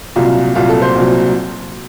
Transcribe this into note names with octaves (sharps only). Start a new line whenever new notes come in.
C2 A#2 F#3 F4
C2 A#2 F#3 F4
A4
C5
C2 A#2 F#3